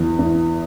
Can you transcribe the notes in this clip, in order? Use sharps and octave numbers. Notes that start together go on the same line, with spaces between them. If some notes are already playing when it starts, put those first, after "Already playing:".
Already playing: E2
E2